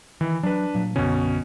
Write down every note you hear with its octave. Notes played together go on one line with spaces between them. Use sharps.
D#3 E3
F#3 D4 B4
A#2 F#3
B1 F#2 B2 D3 C#4